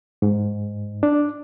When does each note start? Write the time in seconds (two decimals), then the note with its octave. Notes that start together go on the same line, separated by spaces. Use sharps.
0.22 G#2
1.03 D4